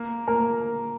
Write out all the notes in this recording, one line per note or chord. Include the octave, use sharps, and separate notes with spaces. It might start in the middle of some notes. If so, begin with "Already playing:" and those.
Already playing: A#3 A#4
A#3 A#4